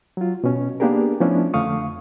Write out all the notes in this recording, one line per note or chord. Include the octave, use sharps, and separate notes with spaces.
F#3 F4
B2 C#4
A#3 B3 D4 G4 G#4 A#4
F3 A3 B3 C#4 D4 E4
F2 D3 A3 F5 C#6 D#6